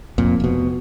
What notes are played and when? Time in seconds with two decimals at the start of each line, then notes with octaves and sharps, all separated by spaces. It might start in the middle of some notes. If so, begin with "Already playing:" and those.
0.18 F1 F2 A#2
0.40 F1 B2